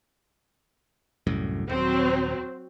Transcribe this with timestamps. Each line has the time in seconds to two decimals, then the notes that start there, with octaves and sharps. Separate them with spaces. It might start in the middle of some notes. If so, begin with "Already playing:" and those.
1.27 C2 F#2 A2
1.70 D#1 F#3 C4